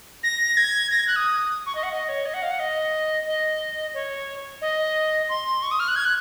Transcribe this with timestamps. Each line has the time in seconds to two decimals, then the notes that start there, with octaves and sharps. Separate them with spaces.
0.24 A#6
0.57 G#6
0.91 A#6
0.99 G#6
1.08 F#6
1.16 D#6
1.66 C#6
1.75 D#5
1.83 F#5
1.92 D#5
2.09 C#5
2.26 D#5
2.34 F#5
2.42 F5
2.51 F#5
2.59 D#5
3.26 D#5
3.94 C#5
4.62 D#5
5.29 C6
5.62 C#6
5.71 D#6
5.80 F6
5.88 F#6
5.96 G#6
6.05 F#6